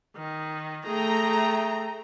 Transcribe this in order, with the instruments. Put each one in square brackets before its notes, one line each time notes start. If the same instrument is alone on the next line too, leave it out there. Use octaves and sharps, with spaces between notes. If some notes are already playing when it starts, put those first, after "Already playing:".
[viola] D#3
[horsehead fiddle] A3 [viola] G#4 G5 [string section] A#5